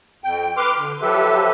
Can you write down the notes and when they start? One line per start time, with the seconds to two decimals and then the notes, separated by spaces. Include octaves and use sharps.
0.24 F2 G5
0.57 B4 C6 D6 F6
0.77 D3
1.02 F3 F#3 G4 A4 B4 E5